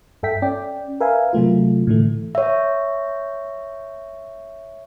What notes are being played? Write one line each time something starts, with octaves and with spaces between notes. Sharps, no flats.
G2 A4 E5 G5 B6
C#4 D5 G5
A#4 B4 E5 F5 G#5
C3 F#3 A3 F4
A2 D3 E3 A3
C#5 E5